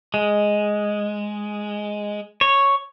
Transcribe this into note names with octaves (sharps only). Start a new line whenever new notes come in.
G#3
C#5